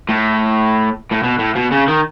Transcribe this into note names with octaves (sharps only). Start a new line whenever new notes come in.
A2
A2
B2
A2
B2
C#3
D#3